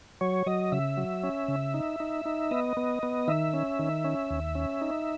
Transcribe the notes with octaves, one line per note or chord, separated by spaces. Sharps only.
F#3 C#5
F#3 D#5
C#3 E5
F#3
C#4
C#3
D#4
D#4
D#4
B3 D#5
B3
B3
D#3 E5
C#4
D#3
C#4
D#2
C#4
D#4